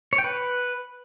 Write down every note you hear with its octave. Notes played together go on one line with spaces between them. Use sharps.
C#5
G5
B4